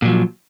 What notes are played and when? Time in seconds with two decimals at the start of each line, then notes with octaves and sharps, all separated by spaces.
0.02 A#2
0.05 F#3
0.08 F3